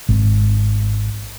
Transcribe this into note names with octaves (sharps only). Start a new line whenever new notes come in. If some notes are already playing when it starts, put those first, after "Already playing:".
G#1